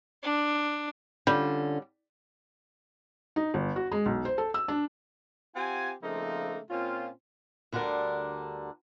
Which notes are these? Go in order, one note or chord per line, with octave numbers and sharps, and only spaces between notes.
D4
D3 G3 C#4 F4
D#4
G1
F#4
G#3
B1
C5
A4
E6
D4
C4 F4 G4 F#5 G#5
C#3 F3 A3 A#3 C4 D#4
A#2 C4 C#4 F4
D2 D3 G3 D4 A#4